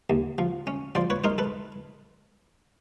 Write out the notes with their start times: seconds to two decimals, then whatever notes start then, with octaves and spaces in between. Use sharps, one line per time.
0.10 D#2
0.38 F3
0.67 C#4
0.95 F3 C5 D5
1.10 B4 C#5
1.24 D#4 A#4 C5
1.38 A4 B4